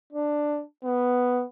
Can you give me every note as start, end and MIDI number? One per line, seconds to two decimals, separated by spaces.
0.13 0.62 62
0.85 1.43 59